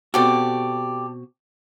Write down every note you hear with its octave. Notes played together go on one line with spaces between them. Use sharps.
B2 C4 F#4 G4 A4 D5